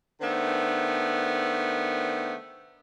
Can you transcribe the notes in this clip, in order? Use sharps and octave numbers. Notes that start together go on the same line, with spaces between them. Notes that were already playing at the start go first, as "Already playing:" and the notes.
D#3 A3 B3 D4 C5